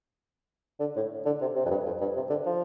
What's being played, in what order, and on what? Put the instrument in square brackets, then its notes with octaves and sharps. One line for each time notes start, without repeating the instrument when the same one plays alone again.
[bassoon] D3
A2
D3
C3
C3
F2
G2
F2
G2
C3
D3
F3